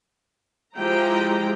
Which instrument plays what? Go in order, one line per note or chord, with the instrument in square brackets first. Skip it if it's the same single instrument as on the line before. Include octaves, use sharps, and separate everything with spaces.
[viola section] F3 G#3 E4 G4 G5 A#5